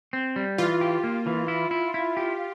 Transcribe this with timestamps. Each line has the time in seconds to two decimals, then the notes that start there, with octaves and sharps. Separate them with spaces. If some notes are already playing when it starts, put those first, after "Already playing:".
0.13 C4
0.36 G3
0.58 E3 F4
0.81 G4
1.04 A#3
1.27 E3
1.48 E4
1.71 E4
1.94 E4
2.17 G4